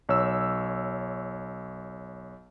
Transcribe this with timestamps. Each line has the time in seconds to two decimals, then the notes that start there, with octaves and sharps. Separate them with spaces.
0.09 B1 C#5 E6